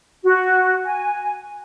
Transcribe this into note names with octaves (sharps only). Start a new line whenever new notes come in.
F#4
G#5